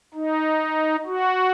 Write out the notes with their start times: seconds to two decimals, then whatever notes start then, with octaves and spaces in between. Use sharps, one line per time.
0.14 D#4
1.06 F#4